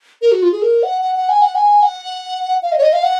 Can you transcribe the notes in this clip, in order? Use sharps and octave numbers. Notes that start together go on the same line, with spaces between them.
A#4
F#4
F4
G#4
A#4
F#5
F#5
F#5
G#5
F#5
G#5
F#5
F5
D#5
C#5
D#5
F5
F#5